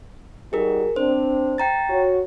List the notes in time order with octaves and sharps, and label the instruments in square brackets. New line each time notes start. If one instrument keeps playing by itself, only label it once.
[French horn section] G3 D#4 F#4 [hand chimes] G#4 A#4
[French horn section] C4 D4 [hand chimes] C5
[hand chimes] G5 A#5 A6
[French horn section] F#4 C#5